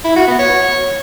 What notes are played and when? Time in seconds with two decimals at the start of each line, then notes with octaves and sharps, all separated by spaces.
0.05 E4
0.16 F#4
0.28 B3
0.39 C#5